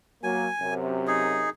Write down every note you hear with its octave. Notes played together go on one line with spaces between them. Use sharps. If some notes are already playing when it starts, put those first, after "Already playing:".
F#3 A#3 G#5
F#2 C3
D#4 G#4